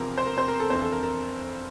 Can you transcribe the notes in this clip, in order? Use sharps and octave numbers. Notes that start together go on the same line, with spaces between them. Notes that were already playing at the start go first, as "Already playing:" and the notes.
Already playing: E1 E2 C3 F3 C4 A#4
C5
A#4
C4 C5
A#4
A4
G1 F2 E3 C4 C5
A4
A#4
A#4